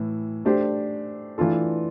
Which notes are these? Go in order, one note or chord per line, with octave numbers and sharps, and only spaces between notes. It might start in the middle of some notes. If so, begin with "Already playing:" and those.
Already playing: A2 E3
A3 D4 G4 C5
E3 A3 D4 F4 A4